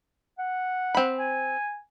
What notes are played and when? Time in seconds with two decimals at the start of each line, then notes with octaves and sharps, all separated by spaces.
0.39 F#5
0.95 C4 B5
1.19 G#5